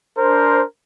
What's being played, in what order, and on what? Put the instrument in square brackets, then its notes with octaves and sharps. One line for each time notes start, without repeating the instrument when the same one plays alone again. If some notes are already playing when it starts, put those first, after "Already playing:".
[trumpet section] D4 A#4 C5